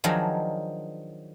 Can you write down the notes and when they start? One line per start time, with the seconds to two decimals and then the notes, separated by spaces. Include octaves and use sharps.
0.04 D#3 F3 F#3 D4 D#4 G#4